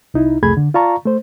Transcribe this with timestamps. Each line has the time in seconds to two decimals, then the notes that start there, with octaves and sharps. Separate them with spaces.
0.14 C2 D#4 E4
0.43 C2 F2 A3 G#4 B5 G#6
0.57 D3
0.74 F4 D5 F5 A5 A#5 C#6
1.05 A3 C5